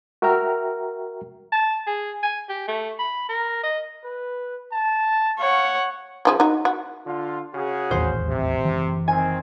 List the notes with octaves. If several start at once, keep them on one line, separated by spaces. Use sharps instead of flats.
F#4 A#4 E5 G5 A#5 F6
A5
G#4
G#5
G4
A3
B5
A#4
D#5
B4
A5
C#5 F5 F#5
C#3 F3 G#4
D#4 F#4
F#4
D3 F4
C#3 F#4 G#4
D#1 A1 E2 C5
C3
F#1 E3
D#3 C4 G#5